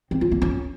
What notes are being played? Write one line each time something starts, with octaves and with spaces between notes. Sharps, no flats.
C4
F4
A#3
C#4